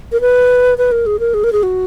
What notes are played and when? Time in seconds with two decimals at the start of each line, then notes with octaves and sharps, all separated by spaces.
0.12 A#4
0.21 B4
0.78 B4
0.92 A#4
1.06 G#4
1.20 A#4
1.34 G#4
1.44 A#4
1.53 G#4
1.63 F#4